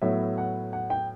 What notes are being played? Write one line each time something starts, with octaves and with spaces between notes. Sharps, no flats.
A2 F#3 B3 E5
F#5
F#5
G5